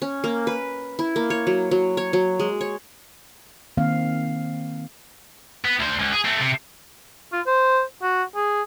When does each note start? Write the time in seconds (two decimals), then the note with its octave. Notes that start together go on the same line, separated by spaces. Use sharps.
0.02 C#4
0.24 A#3
0.47 B4
0.99 E4
1.16 A#3
1.30 C#5
1.47 F#3
1.71 F#3
1.97 C#5
2.13 F#3
2.40 G#3
2.61 C#5
3.77 D#3 A#3 C4 F5
5.65 B3
5.80 D2 C5
5.99 C#2
6.13 G#4
6.25 A3 C4
6.41 C3
7.32 F4
7.47 C5
8.02 F#4
8.36 G#4